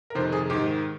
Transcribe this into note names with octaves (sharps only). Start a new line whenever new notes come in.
A#4
F2 C3 D#3 C5
G#4
G#2 D#3 G4